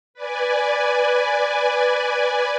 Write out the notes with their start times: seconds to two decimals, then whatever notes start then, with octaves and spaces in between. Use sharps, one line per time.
0.14 B4 D5 G#5